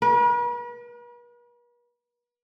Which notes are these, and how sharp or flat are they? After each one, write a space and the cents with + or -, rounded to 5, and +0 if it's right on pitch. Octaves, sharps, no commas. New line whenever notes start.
B4 -45